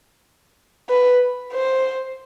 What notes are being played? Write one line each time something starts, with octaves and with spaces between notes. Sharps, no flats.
B4
C5